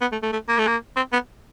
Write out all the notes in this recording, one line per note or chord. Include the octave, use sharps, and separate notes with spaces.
B3
A3
A3
A3
A#3
A3
A#3
C4
B3